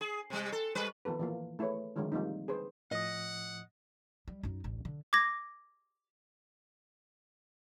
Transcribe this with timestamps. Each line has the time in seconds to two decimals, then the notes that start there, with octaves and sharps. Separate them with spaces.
0.01 G#4
0.30 C3 G3
0.52 A4
0.75 G3 B4
1.05 D#3 F3 B3 A4 B4
1.19 E3 F3 A#3
1.59 A3 E4 G#4 B4 C#5
1.96 D3 D#3 F3 F#3 G#3 E4
2.12 F3 G3 A#3 C4 D#4
2.48 G#4 B4 C5
2.91 A2 F3 D#5 F#5 D#6
4.28 G3
4.43 F#2 D#4
4.64 A1 D2
4.85 D3
5.13 D6 G#6 A#6